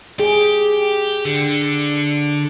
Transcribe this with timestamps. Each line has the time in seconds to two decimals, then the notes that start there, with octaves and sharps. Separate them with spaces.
0.20 G4 G#4
1.25 D3